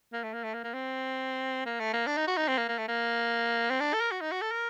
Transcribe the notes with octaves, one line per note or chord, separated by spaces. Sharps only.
A#3
A3
A#3
A3
A#3
A#3
C4
A#3
A3
A#3
D4
D#4
F#4
D#4
C4
A#3
A#3
A3
A#3
C4
D4
A4
A#4
F#4
D#4
F#4
A4
A#4